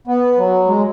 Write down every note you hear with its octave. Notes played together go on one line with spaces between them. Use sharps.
B3
F#3
G#3